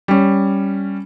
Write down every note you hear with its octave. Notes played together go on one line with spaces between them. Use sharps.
G3 C#4